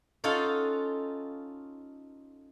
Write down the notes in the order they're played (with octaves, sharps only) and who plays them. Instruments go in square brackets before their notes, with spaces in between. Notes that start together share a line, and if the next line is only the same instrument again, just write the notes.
[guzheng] C#4 D#4 F4 A4 F5 F#5